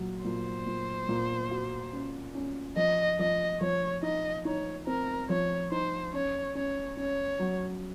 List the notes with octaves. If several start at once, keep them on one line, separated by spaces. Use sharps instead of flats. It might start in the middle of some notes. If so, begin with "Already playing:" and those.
Already playing: A#2 F#3
A#2 C5
A#2
A#2
F#4
C#4
C#4
F3 D#5
F3 D#5
F3 C#5
D#4 D#5
D#4 C#5
C4 A#4
F3 C#5
D#4 C5
C#4 C#5
C#4 C#5
C#4 C#5
F#3